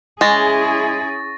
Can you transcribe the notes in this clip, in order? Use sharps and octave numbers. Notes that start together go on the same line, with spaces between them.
G#3 C#4 E4 G#4 C#6 A6 A#6